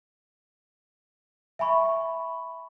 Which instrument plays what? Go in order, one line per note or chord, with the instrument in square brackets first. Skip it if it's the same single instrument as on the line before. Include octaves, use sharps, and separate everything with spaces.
[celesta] E5 G#5 B5 C#6